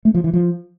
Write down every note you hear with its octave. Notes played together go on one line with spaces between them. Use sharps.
A3
F3
E3
F3